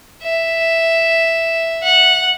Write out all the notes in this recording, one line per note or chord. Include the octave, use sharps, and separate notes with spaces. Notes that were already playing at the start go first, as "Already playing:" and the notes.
E5
F#5